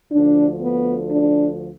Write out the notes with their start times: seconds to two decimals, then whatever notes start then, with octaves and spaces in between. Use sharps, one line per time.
0.12 D2 D3 F3 D4
0.62 B3
1.11 D4